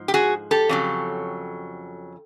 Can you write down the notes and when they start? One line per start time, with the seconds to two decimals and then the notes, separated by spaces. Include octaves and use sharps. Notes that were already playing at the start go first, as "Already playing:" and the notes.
Already playing: G#2 F3
0.08 G4
0.14 F#4 G#4
0.51 G4 A4
0.69 F2 C#3 F#3